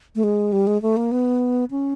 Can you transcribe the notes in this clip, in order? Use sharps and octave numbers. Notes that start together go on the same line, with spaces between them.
A3
G#3
G3
G#3
A3
A#3
B3
C#4